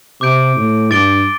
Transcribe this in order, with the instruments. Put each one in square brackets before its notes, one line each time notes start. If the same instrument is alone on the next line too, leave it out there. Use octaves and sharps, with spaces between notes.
[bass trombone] C3 [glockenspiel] D6 G6 D7
[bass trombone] A2
[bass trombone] G2 [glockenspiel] D6 A6 D7 G7